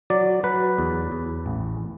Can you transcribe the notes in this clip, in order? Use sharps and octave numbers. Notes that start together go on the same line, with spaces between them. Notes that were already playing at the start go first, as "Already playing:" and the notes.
F#3 D5
F#3 B4
E2
E2
A1